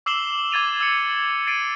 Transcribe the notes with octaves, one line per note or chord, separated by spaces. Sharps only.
D6 E6 C7 E7 F#7 G7
D6 G#6 A6 D#7 F7
E6 C#7 F#7
A6 C7 D7 D#7